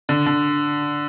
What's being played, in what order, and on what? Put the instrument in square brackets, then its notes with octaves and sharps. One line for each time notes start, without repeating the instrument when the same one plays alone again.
[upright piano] D3
D3